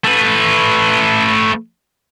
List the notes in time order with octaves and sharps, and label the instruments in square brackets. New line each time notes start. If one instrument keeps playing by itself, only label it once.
[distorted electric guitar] A3 B4